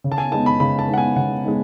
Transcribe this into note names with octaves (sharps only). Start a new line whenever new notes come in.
C#3
A5
G#5
G#3 B3 D#4 A5
B5
C#3 B5
A5
G#3 B3 D#4
F#5
G#5
C#3 F#5
G#3 B3 D#4